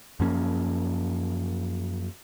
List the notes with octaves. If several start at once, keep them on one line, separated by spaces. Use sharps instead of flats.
F#2 F3 A#3 C#4